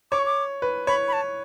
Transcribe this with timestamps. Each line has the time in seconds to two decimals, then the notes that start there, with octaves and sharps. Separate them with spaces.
0.12 C#5 D6
0.19 C#6
0.25 D6
0.62 B4
0.87 C#5 B5
1.08 B5
1.13 A5